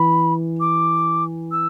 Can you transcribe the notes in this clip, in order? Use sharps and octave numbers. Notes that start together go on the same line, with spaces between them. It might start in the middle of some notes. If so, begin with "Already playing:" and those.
Already playing: E3 B5
D6
E6